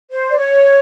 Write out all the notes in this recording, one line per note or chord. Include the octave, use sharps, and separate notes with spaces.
C5
D5
C#5